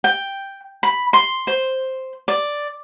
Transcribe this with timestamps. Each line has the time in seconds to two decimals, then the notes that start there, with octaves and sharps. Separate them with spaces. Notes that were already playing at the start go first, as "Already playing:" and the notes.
0.04 G5
0.83 B5
1.13 C6
1.47 C5
2.28 D5